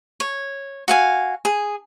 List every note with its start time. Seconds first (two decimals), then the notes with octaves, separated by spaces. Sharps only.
0.20 C#5
0.88 F#4 F5 G#5
1.45 G#4